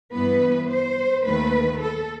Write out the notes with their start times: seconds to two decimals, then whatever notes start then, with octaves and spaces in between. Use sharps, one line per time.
0.13 G2 E3 B3 B4
0.70 C5
1.26 D#2 D#3 A3 B4
1.82 A4